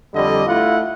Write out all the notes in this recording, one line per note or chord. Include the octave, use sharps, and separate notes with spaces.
F2 D3 G3 D#5
A3 E4 F4 F#5